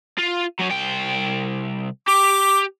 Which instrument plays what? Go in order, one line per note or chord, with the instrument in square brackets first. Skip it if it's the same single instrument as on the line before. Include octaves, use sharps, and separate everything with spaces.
[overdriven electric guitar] F4
F#3 C#4
C2 G5
[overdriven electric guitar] G4 [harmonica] D6